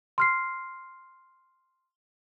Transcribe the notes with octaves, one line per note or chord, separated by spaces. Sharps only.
C6 F6 C7